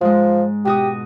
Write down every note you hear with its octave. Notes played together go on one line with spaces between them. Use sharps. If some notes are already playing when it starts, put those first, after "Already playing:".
G#2 F3 G#3
B2 F#4 G4 D#6